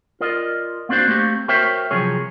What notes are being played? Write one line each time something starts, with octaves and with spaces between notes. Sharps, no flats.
F4 A#4 D5 D#5
A#3 C4 D4 F#4 C5
A3 A#3 C4 G4
F#4 A#4 C5 C#5 E5 G5
C3 F3 F#3 G#4 C#5